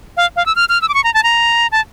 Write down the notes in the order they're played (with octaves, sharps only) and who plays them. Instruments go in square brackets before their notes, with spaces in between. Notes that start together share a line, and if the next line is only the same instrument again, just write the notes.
[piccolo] F5
F5
E6
F6
F6
E6
D6
C#6
A#5
A5
A#5
A5